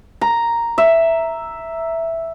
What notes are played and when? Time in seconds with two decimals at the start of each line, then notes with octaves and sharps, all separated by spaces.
0.21 A#5
0.78 E5